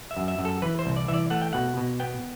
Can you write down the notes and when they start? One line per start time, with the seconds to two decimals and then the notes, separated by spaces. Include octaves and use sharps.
0.11 E5
0.17 F#2
0.28 E5
0.38 F#2
0.45 A4
0.62 E3 B4
0.79 C5
0.86 C2
0.97 D5
1.08 E3 E5
1.14 D5
1.30 A3 F#5
1.42 G5
1.53 B2 F#5
1.77 B2
2.00 B3 G5